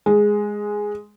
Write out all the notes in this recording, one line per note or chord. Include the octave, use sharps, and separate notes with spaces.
G#3